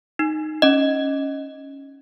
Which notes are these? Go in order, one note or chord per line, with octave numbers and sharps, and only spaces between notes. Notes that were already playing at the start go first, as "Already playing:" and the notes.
D#4
C#4 D#5